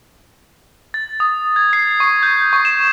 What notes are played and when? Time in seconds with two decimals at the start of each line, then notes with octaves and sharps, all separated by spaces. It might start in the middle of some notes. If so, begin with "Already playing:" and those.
0.94 A6
1.20 D#6
1.56 G#6
1.73 C7
2.00 C#6
2.23 G6
2.53 C#6
2.65 E7